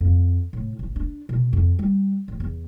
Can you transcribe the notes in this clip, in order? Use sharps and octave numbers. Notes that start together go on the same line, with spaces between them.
F2
A2
A1
D4
B2
F2
G3
A1
E2